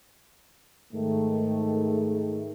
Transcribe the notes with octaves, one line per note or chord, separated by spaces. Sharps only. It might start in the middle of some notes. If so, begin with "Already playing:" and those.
G#2 D#3 A3